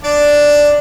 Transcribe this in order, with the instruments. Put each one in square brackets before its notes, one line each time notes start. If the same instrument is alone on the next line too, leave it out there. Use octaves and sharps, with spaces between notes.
[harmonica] D4 D5